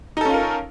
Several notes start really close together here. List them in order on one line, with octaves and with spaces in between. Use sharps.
D#4 A4 C#4 F4 A#4